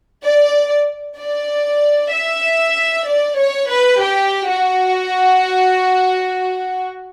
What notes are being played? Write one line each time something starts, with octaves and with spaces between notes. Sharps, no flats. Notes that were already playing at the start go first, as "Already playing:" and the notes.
D5
D5
E5
D5
C#5
B4
G4
F#4